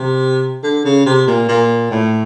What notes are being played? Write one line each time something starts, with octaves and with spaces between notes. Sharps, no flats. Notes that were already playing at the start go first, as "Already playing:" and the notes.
Already playing: C3
D3
C#3
C3
A#2
A#2
A2